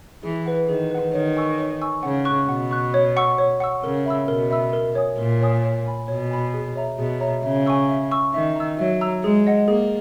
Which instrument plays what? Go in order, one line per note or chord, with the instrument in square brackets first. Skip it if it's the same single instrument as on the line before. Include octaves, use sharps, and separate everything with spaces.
[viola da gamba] E3 [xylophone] G#4
[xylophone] B4 F#5
[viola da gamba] D#3 [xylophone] G#4
[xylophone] B4 F#5
[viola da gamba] D#3 [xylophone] C#5
[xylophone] G#5 C#6 E6
C#5
G#5 C#6 E6
[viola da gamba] C#3 [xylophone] F#5
[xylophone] C#6 F#6
[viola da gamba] B2 [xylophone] F#5
[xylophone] C#6 F#6
C#5
F#5 C#6 E6
C#5
F#5 C#6 E6
[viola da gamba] C#3 [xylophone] A#4
[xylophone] E5 B5 E6
[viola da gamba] B2 [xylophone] A#4
[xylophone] E5 B5 E6
A#4
C#5 G#5 D#6
[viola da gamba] A#2 [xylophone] A#4
[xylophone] C#5 G#5 D#6
C#5
G#5 B5
[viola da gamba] B2 [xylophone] C#5
[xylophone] G#5 B5
G#4
C#5 E5 A#5
[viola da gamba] B2 [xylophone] G#4
[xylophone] C#5 E5 A#5
[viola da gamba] C#3 [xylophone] E5
[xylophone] G#5 C#6 E6
E5
G#5 C#6 E6
[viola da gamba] D#3 [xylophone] E5
[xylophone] A#5 E6
[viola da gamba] F#3 [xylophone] E5
[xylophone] A#5 E6
[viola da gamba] G#3 [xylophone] G#4
[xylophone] D#5 F#5
[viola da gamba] A#3 [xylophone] G#4